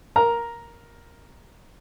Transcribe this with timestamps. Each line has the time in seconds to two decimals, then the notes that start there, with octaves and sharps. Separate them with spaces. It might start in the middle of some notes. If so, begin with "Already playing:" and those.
0.16 A#4 A#5